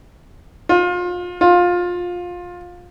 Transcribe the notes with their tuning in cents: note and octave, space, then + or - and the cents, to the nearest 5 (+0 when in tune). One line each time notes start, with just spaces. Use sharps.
F4 +30
F4 +20